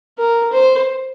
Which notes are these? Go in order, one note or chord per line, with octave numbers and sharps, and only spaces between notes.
A#4
C5